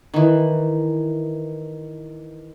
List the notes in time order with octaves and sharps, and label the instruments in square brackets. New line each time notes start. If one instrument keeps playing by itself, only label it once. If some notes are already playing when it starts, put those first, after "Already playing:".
[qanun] D#3 E3